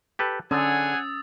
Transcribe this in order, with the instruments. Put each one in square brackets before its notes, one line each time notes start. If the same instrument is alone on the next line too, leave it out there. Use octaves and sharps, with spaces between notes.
[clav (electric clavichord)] G4 A4 B4
[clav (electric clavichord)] D3 [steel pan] C#4 [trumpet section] G#4 F#5 G#5 [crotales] D#6 E6 A6